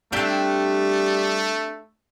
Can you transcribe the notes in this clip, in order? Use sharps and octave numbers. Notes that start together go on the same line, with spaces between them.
G3 A3 C4 D4 G4